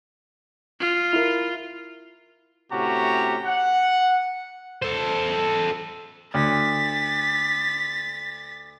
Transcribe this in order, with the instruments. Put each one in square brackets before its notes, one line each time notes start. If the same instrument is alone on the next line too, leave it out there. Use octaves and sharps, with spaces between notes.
[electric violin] F4
[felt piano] E4 A#4
[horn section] A2 C3 C#4 F#4 G4 A#5
F#5
[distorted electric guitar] A4 C5
[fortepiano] D2 [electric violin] A6 B6